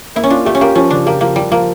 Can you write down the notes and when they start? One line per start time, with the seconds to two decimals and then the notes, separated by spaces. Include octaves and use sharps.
0.16 A#3 E4
0.24 C#4
0.30 D4 F4
0.45 A3 G4
0.55 C#4
0.61 A#3 G4
0.75 F3 C#4
0.90 C#3 D4
1.06 A#3 G4
1.21 F3 A#3
1.36 F3 G3
1.51 F3 A#3